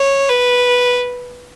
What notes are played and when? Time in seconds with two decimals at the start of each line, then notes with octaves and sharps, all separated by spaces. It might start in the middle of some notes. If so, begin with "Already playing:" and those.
Already playing: C#5
0.30 B4